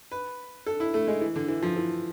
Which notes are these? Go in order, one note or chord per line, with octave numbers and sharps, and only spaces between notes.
B4
A4
E4
A3
G#3
E3
D3
E3
F3
E3